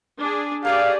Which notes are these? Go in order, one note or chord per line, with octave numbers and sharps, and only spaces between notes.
D4 G#4
G3 A3 G4 G#4 A#4 D5 F5